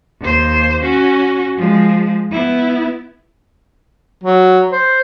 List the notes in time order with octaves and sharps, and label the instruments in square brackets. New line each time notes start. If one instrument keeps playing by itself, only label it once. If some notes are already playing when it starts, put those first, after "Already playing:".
[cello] D#2 C5
C#4 F#4
F3 G#3
B3 E4
[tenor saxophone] F#3
C5